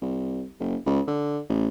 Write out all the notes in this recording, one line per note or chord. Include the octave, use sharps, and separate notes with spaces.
C2
F#1
C#2
D3
A1